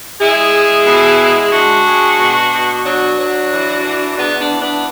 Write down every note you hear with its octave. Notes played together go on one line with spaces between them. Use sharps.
G#3 E4 G#4
G#3
B2
G#3
G#3 D4 F#4
G#3
B2
B2
F#3 D4 F#4
F#3
E3
E3
E2 B3 D4
B3 D4
E3
B3 D4